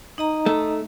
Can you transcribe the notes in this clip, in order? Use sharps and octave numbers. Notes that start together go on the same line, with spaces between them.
D#4 D#5 A#5
A3